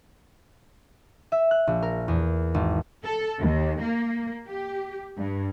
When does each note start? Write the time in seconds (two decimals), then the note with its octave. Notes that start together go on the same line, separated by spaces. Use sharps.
1.32 E5
1.51 F#6
1.67 A#1
1.82 A#4
2.08 E2
2.54 G#1
3.04 A4
3.39 D#2
3.81 A#3
4.48 G4
5.20 G2